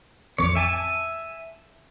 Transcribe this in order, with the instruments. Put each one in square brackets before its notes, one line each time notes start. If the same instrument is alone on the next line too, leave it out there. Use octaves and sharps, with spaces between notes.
[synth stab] A1 F2 D6 [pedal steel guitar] C#5
[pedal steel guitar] E5 G#5 A5